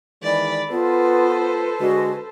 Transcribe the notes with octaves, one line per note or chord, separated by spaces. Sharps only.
D#3 E3 G#3 D5 B5
B3 F4 A4 B4 C5
D3 G#3 F#4